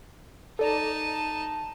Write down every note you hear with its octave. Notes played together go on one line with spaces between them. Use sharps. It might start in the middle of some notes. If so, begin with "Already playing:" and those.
D#4 A4 D5 A5 A#5